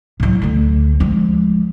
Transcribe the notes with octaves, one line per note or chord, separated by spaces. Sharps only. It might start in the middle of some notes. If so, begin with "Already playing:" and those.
A2 F#3
D2 A3
F3 G#3